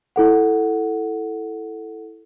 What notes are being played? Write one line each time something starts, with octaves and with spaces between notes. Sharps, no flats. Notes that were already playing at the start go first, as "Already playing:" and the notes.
E4 A4 F#5